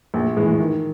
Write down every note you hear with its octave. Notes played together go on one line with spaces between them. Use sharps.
A#1
A2 E3 G#3
D#3